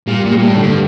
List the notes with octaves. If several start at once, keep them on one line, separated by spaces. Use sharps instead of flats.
A#2 G3
A#2
G3
A#2
A2
D3
G2